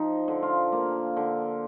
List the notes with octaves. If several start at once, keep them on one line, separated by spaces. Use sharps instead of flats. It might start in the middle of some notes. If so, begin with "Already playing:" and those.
Already playing: F3 D#4
D3
F4
A#3
D3